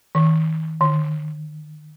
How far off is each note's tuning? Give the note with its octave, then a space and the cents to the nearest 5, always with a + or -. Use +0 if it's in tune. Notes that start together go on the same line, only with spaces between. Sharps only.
D#3 +35
D#3 -35